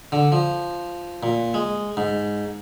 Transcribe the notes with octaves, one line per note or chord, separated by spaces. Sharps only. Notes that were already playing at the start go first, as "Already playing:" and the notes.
D3
F3
A#2
G#3
G#2